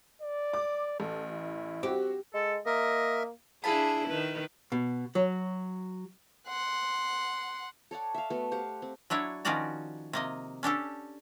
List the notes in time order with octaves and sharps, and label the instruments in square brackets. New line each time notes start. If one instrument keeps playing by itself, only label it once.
[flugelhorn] D5
[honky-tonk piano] D6
[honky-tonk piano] A1 [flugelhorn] A4
[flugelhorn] E4
[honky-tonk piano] C4 F#4 [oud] G4
[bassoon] G#3 [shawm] A4
[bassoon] A#3 [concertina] A#4 E5 [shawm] D#5
[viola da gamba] D4 E4 G#4 [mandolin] F5 A5 B5
[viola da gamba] D#3 B4
[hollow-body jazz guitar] B2
F#3
[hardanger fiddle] F#5 C6
[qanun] A4 C#5 D5 F#5
E5 F5
A3 B3 F#4
G4 C5 F5 F#5
C4
[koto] F#3 D4 E4 C#5
D#3 F3 C#4 F#4 D5 A#5
C3 A#3 D#5
C#4 D4 G4 A4